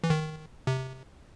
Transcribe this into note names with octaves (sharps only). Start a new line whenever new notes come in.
E3
D#3
C3